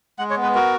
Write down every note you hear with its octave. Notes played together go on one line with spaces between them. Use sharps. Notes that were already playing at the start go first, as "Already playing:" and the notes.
G#3 F#5
C#5
B3
B4
F#4 A#4